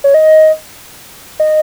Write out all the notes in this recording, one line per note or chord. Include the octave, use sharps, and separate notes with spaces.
C#5
D#5
D#5